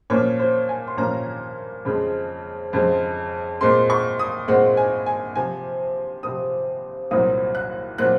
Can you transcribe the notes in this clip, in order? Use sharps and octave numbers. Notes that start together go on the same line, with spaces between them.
A#2 F3 A#3 C#4 C#5
C5
G#5
C6
A#2 F3 A#3 C#4 A#5
F2 C#3 F3 G#3
F2 C#3 F3 G#3
A#2 G#3 C4 C6
C#6
D#6
A#2 G#3 C4 F#5
G#5
G#5
C3 F3 C4 G#5
C3 F3 C4 D#6
C2 A#2 F#3 C4 D#6
F#6
A#2 F#3 C4 F#6